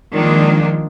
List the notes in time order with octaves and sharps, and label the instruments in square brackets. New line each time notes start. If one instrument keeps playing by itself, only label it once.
[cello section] D#3 F3 G#3 A#3 D4